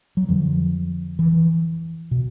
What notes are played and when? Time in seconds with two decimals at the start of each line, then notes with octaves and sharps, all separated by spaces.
0.17 F#3
0.29 F2 D3 F3
1.19 E3
2.11 B2